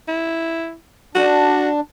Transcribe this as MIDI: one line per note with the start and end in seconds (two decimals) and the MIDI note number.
0.08 0.75 64
1.15 1.80 62
1.15 1.69 66